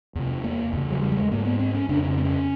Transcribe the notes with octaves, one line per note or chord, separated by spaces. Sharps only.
E2 C3
A#3
E2 C#3
F#3
G3
G3
G#3
G#2 A#3
B3
C4
C#4
F2 C#3 D4
D4
C#4
C4
C#4